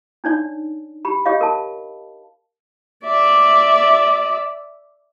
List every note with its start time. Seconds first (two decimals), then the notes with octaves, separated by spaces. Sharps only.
0.24 D4 D#4 C#5 D5
1.05 G4 B5
1.26 G4 C#5 D#5 F5
1.41 A#4 A5
3.04 D5 E5